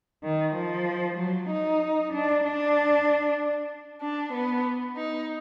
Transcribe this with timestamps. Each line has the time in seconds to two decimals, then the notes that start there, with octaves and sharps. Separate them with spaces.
0.23 D#3
0.55 F3
1.17 F#3
1.49 D#4
2.12 D4
2.44 D4
4.01 D4
4.33 B3
4.96 D#4